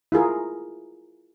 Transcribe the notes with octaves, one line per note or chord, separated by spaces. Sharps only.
E4 F4 G#4 A#4